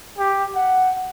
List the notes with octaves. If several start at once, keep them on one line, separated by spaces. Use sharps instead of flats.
G4
F#5